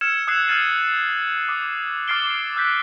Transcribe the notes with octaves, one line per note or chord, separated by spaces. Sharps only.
E6 F6 G#6 C#7 E7
D#6 E6 F#6 G#6 C7 E7
F6 G#6 A6 D#7 F#7
D6 D#6 C7
D6 F6 A6 C7 D7 G7
E6 F#6 G6 B6